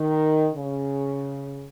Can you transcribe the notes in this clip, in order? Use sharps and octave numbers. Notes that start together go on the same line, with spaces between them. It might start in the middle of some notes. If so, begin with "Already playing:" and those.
Already playing: D#3
C#3